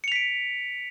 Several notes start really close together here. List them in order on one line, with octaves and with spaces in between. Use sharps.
C#7 F7 B6 D7